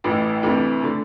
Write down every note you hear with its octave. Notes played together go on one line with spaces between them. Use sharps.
A1 A2 E3
D2 C3 E3 A3
D3 A3